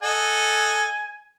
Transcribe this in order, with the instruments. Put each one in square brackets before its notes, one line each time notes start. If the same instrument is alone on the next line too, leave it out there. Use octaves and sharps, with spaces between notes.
[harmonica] A4 D#5 F#5 [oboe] G#5